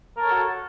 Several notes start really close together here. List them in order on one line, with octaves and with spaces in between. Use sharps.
A#4 A5 C#5 A4 F#4